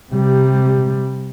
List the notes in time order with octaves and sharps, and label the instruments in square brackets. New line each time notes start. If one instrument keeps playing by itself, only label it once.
[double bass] C3 G3